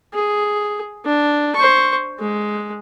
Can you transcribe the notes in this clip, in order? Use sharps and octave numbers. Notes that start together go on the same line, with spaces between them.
G#4
D4
C5 C#6
G#3